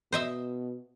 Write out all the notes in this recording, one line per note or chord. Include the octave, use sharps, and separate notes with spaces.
B2 C5 D#5 E5